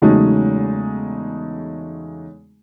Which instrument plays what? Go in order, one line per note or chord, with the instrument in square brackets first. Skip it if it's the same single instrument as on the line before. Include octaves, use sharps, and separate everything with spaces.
[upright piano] E2 C#3 F#3 G#3 A3 D#4